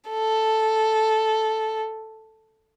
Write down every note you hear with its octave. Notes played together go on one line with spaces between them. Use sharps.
A4